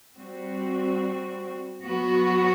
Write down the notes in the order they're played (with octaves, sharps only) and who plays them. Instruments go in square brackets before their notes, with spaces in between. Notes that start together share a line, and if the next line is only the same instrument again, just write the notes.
[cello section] G3 C4 F#4
F#3 B3 F#4